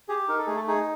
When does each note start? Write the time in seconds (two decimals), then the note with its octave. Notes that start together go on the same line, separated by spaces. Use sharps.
0.09 G4 G#4
0.28 D#4 A#4
0.38 A4
0.47 A3 G#4
0.55 A4
0.67 D#4 G#4